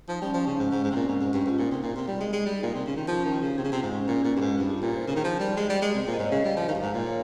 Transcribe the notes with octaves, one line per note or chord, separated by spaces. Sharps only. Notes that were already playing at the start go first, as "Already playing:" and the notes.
F3 D#4
G3 C#4
F3 C#4
C#3 C#4
G#2
G#2
G#2
C3
A#2 C4
G#2 C#4
G#2
G2
G#2 F4
A#2 D#4
C3
A#2
C3
G3
G#3
G#3
G3
A#2 D#4
C3
C#3
D#3
F3 F4
C#4
D#3 D#4
F4
C#3 G4
C3 G#4
C#3
C3 F4
G#2 D#4
C#4
A#2 C#4
A#2
G2
G#2
G2 D#4
F4
A#2 G4
C5
C#3 A#4
D#3 G#4
F3 A#4
G3
G#3
G3
G#3
C3
A#2 C5
D#5
G#2 C#5
C#3 D#5
G3 F5
F3 D#5
D#3 F5
G2
G#2 F5
A#2
C#5